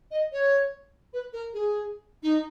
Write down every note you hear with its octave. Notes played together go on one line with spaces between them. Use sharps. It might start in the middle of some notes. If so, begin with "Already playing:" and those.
D#5
C#5
B4
A#4
G#4
D#4